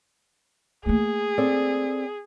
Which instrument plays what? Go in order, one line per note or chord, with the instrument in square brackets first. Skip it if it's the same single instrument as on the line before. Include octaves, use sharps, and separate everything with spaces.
[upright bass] A3 A#3 [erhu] G#4
[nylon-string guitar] C4 A4 D5